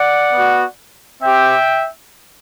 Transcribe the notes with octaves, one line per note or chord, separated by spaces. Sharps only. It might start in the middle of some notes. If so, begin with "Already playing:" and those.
Already playing: D5 F#5
B3 F#4
C4 G4 E5 G5